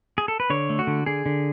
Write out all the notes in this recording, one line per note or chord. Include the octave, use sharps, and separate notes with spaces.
G#4
A4
B4
D3 C#5
A3
F#4
D3
D3 G#4
D3